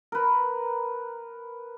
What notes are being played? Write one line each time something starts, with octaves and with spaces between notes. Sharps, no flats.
A#4 B4